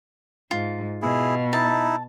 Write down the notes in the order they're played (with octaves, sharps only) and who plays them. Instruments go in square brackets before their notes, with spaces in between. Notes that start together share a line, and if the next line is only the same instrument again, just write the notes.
[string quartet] G#2 [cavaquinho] F4
[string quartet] B2 [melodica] E4 G#4
[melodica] D#4 E4 [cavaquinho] A5